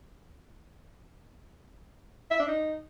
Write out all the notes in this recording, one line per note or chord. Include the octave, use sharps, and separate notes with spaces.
E5
D4
D#4